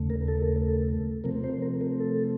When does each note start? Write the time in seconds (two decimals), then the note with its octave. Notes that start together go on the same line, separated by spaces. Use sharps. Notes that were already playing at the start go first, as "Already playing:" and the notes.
Already playing: D#2 C#3 A3
0.10 A#4
0.28 A4
0.43 A#4
0.56 A4
1.24 C3 F3 A3 C4 A#4
1.44 C5
1.62 A#4
1.81 A#4
2.00 A4